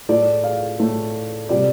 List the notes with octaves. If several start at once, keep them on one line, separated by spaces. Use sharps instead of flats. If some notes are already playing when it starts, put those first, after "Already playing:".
A2 A3 D5
F5
A2 A3
C3 G3 D5